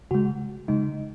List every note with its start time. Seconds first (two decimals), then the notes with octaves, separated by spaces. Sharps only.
0.11 C#3 G#3 F#4
0.68 C#3 G#3 D#4